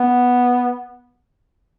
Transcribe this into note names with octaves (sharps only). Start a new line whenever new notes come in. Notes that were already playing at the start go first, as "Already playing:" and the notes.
Already playing: B3